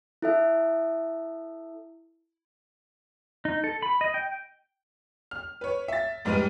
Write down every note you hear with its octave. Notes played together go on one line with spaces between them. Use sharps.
E4 A4 E5
D#4
A4
B5
D#5
G5
F6
B4 C#5
E5 A6
F1 G#2 G3 B4 F6 D#7